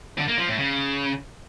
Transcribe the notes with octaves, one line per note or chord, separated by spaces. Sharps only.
D3
A#3
F3
A2
C#3